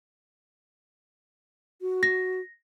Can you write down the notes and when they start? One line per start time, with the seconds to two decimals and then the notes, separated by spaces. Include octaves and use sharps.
1.82 F#4
2.03 A#6